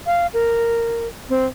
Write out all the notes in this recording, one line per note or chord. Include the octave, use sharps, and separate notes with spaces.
F5
A#4
C4